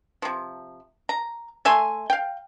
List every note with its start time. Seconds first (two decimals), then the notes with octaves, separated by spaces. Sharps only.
0.22 C3 F3
1.09 A#5
1.65 A3 E5 G#5 C6
2.10 F5 G5